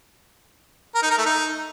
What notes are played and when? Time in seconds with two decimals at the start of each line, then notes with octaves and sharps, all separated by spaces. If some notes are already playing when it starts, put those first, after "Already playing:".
0.95 A#4
1.03 D#4
1.10 A#4
1.18 A3
1.26 D#4